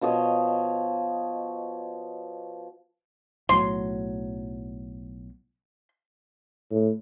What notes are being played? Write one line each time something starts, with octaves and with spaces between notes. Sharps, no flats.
B2 F3 C#5 D#5
B1 A2 F#3 C6
A2